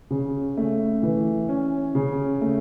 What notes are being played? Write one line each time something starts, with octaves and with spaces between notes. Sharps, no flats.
C#3
A3
E3
C#4
C#3
A3